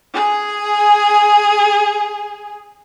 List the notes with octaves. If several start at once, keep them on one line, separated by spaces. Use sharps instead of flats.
G#4 G#5